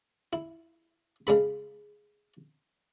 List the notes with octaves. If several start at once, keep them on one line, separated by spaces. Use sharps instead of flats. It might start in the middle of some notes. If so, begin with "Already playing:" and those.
E4
C#3 G#3 A4 B5